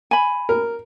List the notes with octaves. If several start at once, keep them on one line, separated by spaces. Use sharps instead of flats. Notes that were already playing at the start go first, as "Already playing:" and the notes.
G#5 B5
A#4